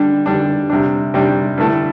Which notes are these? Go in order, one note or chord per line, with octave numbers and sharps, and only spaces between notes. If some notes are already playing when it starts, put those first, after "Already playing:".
Already playing: D3 G3 D4
D3 G3 D4
C3 G3 D4
C3 G3 D4
G2 D3 A3 E4 A4